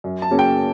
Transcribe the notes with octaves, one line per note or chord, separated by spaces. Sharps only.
F#2
A5
C#3 F#3 A#3 C#4
G5